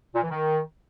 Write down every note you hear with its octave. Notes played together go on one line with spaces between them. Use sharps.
A#2
E3
D#3